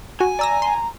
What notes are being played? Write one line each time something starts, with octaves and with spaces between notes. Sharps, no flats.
F#4 G#5
D5 A#5 E6 A#6
C6